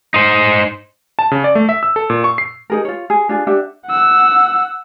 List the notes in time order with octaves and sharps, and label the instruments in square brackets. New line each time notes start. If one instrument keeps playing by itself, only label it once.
[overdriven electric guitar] D#4 C5
[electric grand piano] A5
C#3
D5
A3
E5
E6
A4
A#2
C#6
C7
[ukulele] D#4 G#4 A#4
F4 C#5
G#4
D4 F4 G#4
D4 G4 E5 F#5
[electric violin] F#5 E6